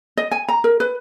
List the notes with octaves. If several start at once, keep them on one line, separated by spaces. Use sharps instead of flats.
D#5
G#5
A#5
A#4
B4